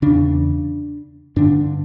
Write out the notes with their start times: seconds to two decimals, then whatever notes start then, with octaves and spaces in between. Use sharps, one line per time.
0.02 E2 C#3 D4
1.36 G2 D3 D4